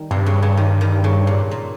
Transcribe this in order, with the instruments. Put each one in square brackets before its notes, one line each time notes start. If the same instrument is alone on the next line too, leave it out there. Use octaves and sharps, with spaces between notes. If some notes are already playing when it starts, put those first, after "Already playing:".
Already playing: [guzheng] D#3 G3
[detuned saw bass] G2 [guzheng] C3
[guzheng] C#3
C#3
D#3
D#3
C#3
A#2
A#2